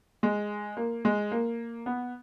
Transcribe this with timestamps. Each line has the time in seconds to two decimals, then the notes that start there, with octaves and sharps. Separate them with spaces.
0.23 G#3
0.77 A#3
1.05 G#3
1.32 A#3
1.86 B3